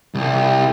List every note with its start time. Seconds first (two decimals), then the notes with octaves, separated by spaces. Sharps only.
0.15 C2